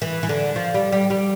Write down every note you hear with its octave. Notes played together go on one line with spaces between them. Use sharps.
E3
E3
D3
F3
G3
G3
G3